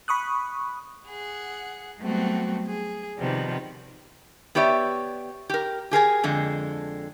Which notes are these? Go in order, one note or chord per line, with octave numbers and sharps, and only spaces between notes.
B5 C#6 D#6 F#6
G#4 F#5
F#3 G3 A3 B3 C4 F#4
G#4
C3 D#3 F3 G3 B3
B3 G4 C#5 D5 E5
G4 A#4
G4 G#4 A#4 G#5
F2 D3 G#3